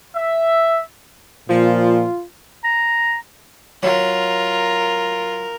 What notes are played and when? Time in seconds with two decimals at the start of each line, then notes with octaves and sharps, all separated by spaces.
0.14 E5
1.49 A#2 F3 F4
2.64 A#5
3.83 F#3 F4 A#4